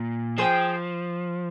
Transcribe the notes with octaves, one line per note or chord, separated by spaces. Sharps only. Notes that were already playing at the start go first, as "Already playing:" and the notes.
Already playing: A#2
F3 G#4 C5 G5